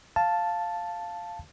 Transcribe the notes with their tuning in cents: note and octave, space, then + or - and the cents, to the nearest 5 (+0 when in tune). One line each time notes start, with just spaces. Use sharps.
F5 -5 A5 +0